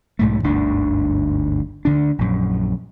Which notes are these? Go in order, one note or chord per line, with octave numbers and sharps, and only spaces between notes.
B1 G#2 A3
G1 D2 G#2 D4
D2 D3 D4
A#1 F#2